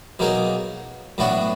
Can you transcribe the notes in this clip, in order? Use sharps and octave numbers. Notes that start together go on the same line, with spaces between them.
B2 F#3 A#3 D#4 G#4
A2 F#3 B3 D4 F#4